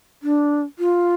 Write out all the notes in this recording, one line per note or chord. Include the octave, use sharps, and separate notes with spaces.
D4
F4